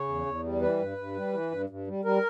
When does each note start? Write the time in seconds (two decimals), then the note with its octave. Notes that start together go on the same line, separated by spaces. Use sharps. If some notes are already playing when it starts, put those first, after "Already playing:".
Already playing: C#3 C#5
0.08 E2
0.26 E2
0.44 G3
0.62 E3 B4
0.79 G2
0.98 G2
1.16 G3
1.33 E3
1.51 G2
1.70 G2
1.87 G3
2.05 G3 A#4